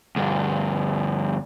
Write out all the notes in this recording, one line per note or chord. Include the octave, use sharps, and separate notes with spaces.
D2 G2